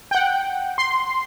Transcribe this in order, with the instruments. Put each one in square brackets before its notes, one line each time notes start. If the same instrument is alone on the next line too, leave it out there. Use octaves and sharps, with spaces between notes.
[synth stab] F#5 G5
C6